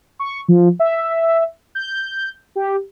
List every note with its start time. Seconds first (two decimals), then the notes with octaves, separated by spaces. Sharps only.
0.19 C#6
0.48 F3
0.80 E5
1.75 G6
2.56 G4